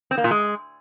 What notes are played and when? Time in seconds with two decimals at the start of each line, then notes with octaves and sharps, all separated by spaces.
0.11 C4
0.18 A#3
0.24 A#2
0.31 G#3